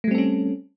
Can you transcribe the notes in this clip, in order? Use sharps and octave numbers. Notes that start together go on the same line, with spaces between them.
G3 A3 C4 C#4 A4